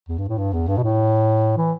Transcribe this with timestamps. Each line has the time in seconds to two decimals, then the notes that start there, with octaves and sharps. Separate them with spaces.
0.09 E2
0.18 G2
0.29 A2
0.38 G2
0.53 E2
0.68 G2
0.77 B2
0.83 A2
1.57 E3